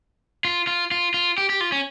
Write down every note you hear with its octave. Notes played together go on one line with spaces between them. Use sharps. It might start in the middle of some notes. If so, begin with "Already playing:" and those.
F4
F4
F4
F4
G4
G4
F4
C#4